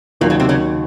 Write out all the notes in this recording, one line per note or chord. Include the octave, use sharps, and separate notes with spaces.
D#2 A#2 D#3 F#3 A#3
C#3 C#4
C3 C4
C#3 C#4